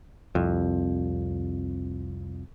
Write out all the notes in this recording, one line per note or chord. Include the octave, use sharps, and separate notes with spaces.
C2 F2